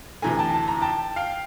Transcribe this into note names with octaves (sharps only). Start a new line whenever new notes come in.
D2 C3 E3 A3 G#5 A#5
G5 A5
A5
A#5
G5 A5
F5 G5